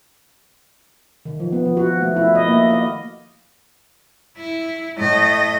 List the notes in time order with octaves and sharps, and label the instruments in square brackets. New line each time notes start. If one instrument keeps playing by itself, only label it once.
[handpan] D#3
F3
B3
F3
F#4
A3
E4
D#5
A#3
D#5
[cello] E4
A2 D#5